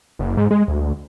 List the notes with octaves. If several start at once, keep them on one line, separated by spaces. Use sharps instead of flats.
F#1
G#2
G#3
D2